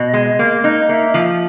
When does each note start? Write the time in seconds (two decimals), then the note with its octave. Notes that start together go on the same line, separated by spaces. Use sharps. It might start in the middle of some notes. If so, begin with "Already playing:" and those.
Already playing: B2 D#5
0.13 G#3
0.39 A#3
0.64 D#4
0.89 A#3 E5
1.14 F3